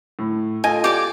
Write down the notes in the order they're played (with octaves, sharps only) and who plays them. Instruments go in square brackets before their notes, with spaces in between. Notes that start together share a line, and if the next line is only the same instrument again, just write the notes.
[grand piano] A2
[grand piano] F4 A4 D#5 [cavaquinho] G#5
[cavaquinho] G4 D5 D6